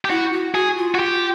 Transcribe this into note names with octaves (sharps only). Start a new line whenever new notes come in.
G4
E4 F#4
F#4
F#4 G#4
F4
F#4
G4